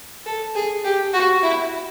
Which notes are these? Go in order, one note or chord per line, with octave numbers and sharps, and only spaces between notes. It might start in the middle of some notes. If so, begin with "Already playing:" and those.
A4
G#4
G4
F#4
E4